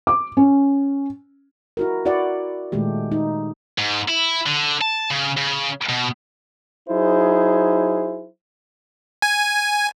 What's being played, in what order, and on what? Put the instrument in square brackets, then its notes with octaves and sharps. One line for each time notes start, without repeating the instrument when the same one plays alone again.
[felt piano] D6
C#4
[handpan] E4 F#4 A#4
E4 F#4 D5 F#5
A#2 D#3 G#3 A3 G4
D#4
[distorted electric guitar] G#2
E4
D3
A5
C#3
C#3
B2
[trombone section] F#3 D#4 E4 G#4 C5
[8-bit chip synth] G#5